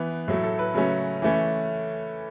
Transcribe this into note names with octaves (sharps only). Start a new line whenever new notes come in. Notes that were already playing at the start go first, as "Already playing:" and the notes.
Already playing: E3 B3
A2 F#3 A3
A4
B4
C#3 F#3 A3 C#4
E3 A3 C#4